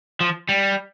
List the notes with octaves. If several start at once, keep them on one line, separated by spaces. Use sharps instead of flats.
F3
G3